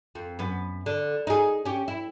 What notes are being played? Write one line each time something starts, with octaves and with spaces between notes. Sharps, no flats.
F2
F#2 B3
D3
D#4 G#4
C#4 G4
E4